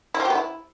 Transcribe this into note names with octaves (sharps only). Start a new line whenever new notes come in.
E4
F3
G4
B3
E4